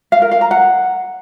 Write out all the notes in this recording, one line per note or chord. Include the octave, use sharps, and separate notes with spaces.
F5
A#4
F5
A#5
F#5